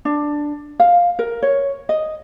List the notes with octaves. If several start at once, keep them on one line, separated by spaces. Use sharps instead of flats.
D4
F5
A#4
C#5
D#5